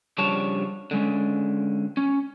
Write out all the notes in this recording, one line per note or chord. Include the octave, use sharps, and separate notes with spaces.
C#3 F3 G3 D4 C#5 A5
D3 G#3 C#4
C#4